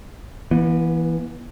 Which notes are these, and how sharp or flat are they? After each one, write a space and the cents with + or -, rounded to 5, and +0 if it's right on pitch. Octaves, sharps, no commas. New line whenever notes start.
E3 +0 B3 -40